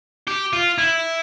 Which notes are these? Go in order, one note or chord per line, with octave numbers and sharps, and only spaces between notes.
G4
F4
E4